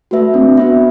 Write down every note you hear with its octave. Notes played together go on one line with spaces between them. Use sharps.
A3 F#4 B4 E5
C4 D4
B3 F#4 B4 E5